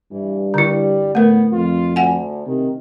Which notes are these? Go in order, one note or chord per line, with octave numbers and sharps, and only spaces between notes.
G2 E3
D3 G3 E4
A2 A3 B3 A#4
F2 F4
D2 F#5 G#5
C3 D#3